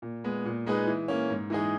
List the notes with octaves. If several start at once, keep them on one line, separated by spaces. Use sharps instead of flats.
A#2
G#3 B3
A#2
G#3 D#4 G#4 B4
E3
A#3 C#4
G#2
E3 G#3 D#4 G#4